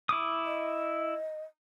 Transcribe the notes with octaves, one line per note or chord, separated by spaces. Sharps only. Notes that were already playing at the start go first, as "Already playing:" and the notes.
E4 D6 D#6
D#5